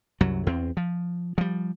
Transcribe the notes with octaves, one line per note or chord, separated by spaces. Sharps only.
C2 F#2 F#3
E2 C4
F3
F3 G3